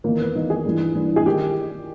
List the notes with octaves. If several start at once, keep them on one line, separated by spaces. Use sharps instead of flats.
E2 D#3 A#3
B3
E2 D#3 D#4
G#4
G2 E3
G2 E3
G#4
D#3 G4